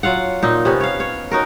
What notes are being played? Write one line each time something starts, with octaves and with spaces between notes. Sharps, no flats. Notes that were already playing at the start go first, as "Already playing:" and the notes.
F#3 F4 F5 F#5
A#2 D#4
C3 B3 C#4
C#5 F5
C#5
C#4 D#4 F#4 A#4